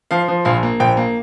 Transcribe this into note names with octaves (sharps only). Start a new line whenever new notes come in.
F3 F5
F3
A#1 F5
A#3
A#1 G5
A#3